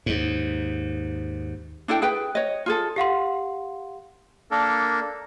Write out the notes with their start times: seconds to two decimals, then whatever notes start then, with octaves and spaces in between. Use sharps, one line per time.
0.06 D#2 G#2
1.88 D4 E4 A4 G5
2.02 G#4 B4 G5
2.35 C#5 D#5
2.66 F4 G#4 A4
2.96 G4 F5 F#5 C6
4.51 A#3 D4 A4 A#4